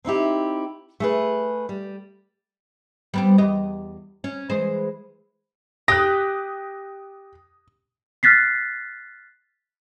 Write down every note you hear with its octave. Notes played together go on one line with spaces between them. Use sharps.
C4 D#4 E4 G4
A3 G#4 B4
G3
G3 B3 C4
E2 G4 D#5
C#4
E3 G#3 C5
G4 D#6 F#6 A#6
F6 F#6 A6 B6 C7